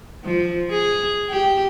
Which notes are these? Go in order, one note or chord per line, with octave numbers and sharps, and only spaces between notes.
F3
G#4
G4